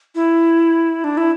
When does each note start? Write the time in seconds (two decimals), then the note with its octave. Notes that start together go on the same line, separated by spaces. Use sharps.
0.15 E4
1.04 D4
1.17 E4